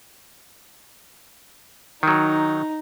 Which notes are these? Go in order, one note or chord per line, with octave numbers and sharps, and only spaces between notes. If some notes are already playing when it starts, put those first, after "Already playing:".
D#3 F#3 D#4